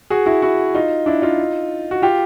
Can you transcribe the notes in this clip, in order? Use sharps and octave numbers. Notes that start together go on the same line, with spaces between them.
F#4 G#4
E4 F#4
E4 F#4
D#4 F4
D4 E4
D#4 F4
F#4
F4 G4